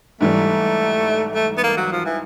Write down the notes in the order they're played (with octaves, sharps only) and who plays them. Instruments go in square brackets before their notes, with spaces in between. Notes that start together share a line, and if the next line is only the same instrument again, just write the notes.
[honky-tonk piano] G#2 E3 G3 [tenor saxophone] A3
[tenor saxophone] A3
B3
A#3
F#3
F3
E3